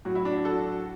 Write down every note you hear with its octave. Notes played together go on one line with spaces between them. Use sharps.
A2 F#3 F#4
E4
D4 F#4
F#4 A4